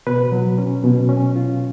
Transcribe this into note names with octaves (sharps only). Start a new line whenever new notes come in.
B2 B4
F#3
C#4
B2
C#4
F4